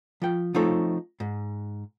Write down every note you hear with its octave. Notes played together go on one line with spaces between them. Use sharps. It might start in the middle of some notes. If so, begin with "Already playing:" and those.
F3 G5
F3 A3 C4 D#4 A4 C#5
G#2